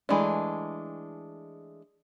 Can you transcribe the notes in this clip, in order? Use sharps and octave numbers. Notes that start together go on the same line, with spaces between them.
E3 G#3 A3 D4